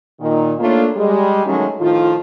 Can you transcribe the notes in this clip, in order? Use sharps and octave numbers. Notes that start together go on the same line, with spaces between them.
A#2 D#3
A3 A#3 D4 F4 C#5
G3 G#3
D#3 F#3 G#3 A3 C#4
A2 D#3 F3 F4